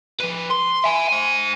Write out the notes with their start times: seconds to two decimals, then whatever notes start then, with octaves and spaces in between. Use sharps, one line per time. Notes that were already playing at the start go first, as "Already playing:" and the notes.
0.20 F3 B4
0.51 C6
0.84 E5 G#5
1.09 C5 G#5